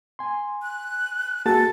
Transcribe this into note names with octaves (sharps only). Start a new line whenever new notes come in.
G#5 C6
F#6
A#3 F#4 G#4 A4 A5